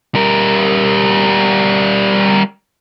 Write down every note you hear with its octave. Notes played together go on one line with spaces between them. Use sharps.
G3 A#4